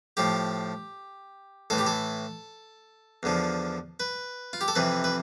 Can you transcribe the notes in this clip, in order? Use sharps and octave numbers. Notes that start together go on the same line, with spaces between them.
A2 F3 G4
A2 E3 A4
G4
A4
E2 D3 F3
B4
F4
G4
A4
F2 C3 E3 B4
B4